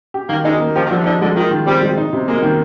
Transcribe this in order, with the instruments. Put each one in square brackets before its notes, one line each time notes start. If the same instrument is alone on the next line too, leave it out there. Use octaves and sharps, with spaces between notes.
[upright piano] G4
[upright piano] D#3 [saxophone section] A#3
[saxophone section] G#3 [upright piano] D#4
[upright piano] A#3
[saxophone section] F3 [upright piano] G4
[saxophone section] D#3
[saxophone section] D3 [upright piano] F3
[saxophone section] C3
[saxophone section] D3 [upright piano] D#4
[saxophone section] D3 [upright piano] G#3
[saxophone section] D#3 [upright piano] F4
[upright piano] D#3
[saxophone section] G3 [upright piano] C4
[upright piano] G#3
D#4
C3
[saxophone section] G#3 [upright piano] A#3
[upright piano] D#3